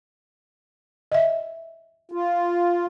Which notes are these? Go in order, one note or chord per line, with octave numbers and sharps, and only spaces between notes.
D#5 E5
F4